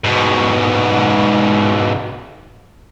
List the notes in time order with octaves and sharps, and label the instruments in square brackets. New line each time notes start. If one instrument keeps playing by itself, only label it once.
[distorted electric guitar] G#2 B2